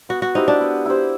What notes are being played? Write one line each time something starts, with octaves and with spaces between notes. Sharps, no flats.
B3 F#4
F#4
D#4 E4 G4 C5
D4
B3
E4 G4 C5